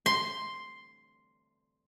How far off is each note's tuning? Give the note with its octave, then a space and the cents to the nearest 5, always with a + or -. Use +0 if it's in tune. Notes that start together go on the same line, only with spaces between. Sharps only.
C6 +0